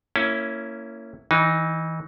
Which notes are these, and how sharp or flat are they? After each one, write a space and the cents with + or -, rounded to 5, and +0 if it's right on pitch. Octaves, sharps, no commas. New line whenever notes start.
A#3 -25 C#4 +0 E4 +0
E3 -25 D#4 +0